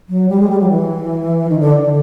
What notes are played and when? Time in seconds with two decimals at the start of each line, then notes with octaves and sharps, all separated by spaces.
0.09 F#3
0.29 G3
0.40 G#3
0.49 G3
0.59 F#3
0.69 E3
1.50 D#3
1.60 D3
1.81 D3